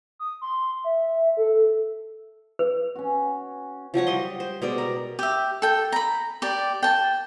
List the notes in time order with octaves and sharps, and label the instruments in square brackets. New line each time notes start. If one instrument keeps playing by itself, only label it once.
[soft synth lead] D#6
C6
E5
A4
[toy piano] B4
[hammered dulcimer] C#4 F#4
[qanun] F3 F#3 F#4 C#5
G3 D#5 C6
C5
B2 G#3 D5
A#4
[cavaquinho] G4 E5
A4 G5
A#5 B5
G4 D5
G5 A5